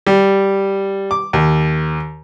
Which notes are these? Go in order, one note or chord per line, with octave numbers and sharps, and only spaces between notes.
G3
D6
D#2